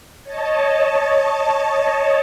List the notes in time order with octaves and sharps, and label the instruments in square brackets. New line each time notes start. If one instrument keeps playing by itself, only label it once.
[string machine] C#5 D#5 A5